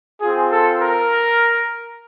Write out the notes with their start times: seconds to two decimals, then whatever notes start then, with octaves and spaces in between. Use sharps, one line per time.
0.20 C4 F4 G#4
0.49 A4
0.78 A#4